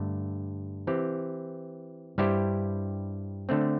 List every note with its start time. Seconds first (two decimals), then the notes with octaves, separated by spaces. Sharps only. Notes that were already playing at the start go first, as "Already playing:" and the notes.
Already playing: G2 D3 A3
0.87 E3 C4 G4
2.18 G2 G3 E4 G4 C5
3.49 D3 A3 C4